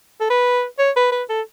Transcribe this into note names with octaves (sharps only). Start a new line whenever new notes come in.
A4
B4
C#5
B4
B4
A4